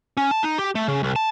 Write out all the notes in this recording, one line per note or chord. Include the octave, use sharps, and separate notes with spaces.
C#4
A5
D#4
G4
A3
C#3
C2
A5